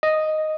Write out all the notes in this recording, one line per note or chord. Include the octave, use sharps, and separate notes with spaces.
D#5